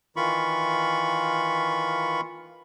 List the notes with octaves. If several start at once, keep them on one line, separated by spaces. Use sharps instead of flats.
D#3 E3 F4 B5 C#6